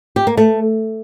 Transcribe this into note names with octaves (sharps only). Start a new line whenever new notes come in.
G4
A#3
A3